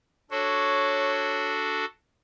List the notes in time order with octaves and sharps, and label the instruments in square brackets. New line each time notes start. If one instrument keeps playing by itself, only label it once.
[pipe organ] D4 F#4 A4 [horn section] C#5